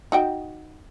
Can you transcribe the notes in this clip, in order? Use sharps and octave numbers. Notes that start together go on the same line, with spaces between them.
D#4 F#4 G5